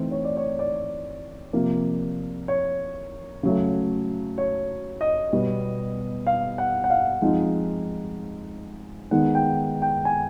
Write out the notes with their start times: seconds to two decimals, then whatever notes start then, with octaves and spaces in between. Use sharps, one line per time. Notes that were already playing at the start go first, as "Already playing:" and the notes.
Already playing: E3 A3 C4 D#4 C5
0.11 C#5
0.25 D5
0.37 C#5
0.59 D5
1.53 C3 F3 A#3
2.48 C#5
3.43 C#3 F#3 A3
4.38 C#5
5.01 D#5
5.33 B2 G3 B3
6.27 F5
6.58 F#5
6.84 F#5
6.90 F5
7.22 F3 G#3 C4 D#4
9.11 D#3 G#3 B3 D#4 F#5
9.35 G5
9.82 G5
10.05 G#5